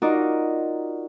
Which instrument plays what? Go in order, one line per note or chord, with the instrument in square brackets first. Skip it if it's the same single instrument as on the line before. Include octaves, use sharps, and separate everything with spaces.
[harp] D#4 F4 F#4 A#4 D5